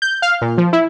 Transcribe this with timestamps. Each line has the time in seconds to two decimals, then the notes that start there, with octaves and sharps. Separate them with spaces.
0.02 G6
0.22 F5
0.42 A#2
0.58 F3
0.73 E4